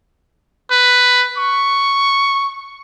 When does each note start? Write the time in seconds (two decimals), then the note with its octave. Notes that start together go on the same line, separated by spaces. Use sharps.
0.71 B4
1.38 C#6